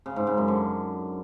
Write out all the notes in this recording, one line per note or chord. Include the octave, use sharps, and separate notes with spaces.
C#3
G#2
C#3
F#2
D3